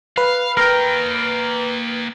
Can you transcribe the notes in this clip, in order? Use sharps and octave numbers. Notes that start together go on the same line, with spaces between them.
B4 F5
A#3 A#4 G5